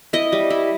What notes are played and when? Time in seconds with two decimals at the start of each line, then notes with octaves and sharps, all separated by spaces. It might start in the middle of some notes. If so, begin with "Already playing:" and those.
0.13 E4 D#5
0.32 G3
0.50 E4